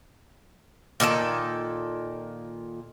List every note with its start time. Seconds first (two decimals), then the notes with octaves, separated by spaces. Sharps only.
1.00 A#2 D#3 A4 A5